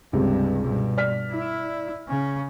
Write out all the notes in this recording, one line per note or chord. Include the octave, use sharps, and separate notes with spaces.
C#2 G2 C3
G2 B2
D5 F6 B6
E4
C#3 C#4